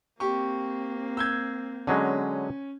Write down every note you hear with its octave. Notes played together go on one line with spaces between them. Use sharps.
A#3 C4 G4 C#6
E6 G6 G#6
D3 F#3 G#3 C#4